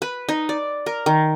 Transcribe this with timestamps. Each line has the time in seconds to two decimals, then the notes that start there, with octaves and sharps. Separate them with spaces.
0.02 B4
0.29 D#4
0.49 D5
0.86 A#4
1.06 D#3